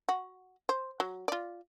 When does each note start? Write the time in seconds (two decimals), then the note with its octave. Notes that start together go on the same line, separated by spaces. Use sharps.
0.09 F#4
0.69 C5
1.00 F#3
1.28 F4 D5